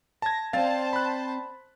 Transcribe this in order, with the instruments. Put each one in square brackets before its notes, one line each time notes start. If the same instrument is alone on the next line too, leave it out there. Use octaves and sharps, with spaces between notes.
[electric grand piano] A5 G#6 [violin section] A#6
[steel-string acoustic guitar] C4 D5 G#5 [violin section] C5 A5 [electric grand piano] F5 A6
[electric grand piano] B5 F#6